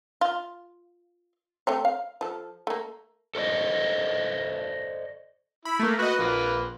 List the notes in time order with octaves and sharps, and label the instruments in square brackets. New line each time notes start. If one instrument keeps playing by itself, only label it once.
[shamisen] F4
A3 C4 C#5
F5
F3 A4
A3 A#3
[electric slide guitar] A4 C5 D5 D#5
[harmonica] E4 [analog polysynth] B5
[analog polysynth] A3 A#3
[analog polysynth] F#4 D#5 [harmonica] B4
[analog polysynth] A#1 [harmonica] A#3 F4 B4